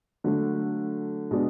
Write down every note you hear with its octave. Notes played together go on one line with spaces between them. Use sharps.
D3 F#3 A3
B2 G#3 D4